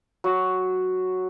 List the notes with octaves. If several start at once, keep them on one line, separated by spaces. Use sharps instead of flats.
F#3